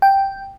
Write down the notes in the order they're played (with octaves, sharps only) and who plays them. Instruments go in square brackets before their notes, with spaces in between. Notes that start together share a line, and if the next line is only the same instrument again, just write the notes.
[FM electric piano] G5